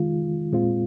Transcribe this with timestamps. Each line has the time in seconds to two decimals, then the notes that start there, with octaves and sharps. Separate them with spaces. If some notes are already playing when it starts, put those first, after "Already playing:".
Already playing: D#3 G#3 F4
0.52 A#2 G#3 C4 F4